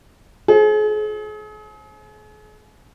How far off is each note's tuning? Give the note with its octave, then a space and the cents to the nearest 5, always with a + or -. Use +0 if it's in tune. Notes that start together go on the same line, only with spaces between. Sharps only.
G#4 +40 C5 +35